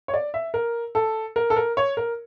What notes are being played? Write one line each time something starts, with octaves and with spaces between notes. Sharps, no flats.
C#5
D5
E5
A#4
A4
A#4
A4
A#4
C#5
A#4